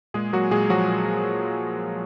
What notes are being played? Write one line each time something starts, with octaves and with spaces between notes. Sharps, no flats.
A#2 G#3 G#4
F#3 A#3 F#4
A#2 G#3 G#4
F3 F#3 F#4
A#2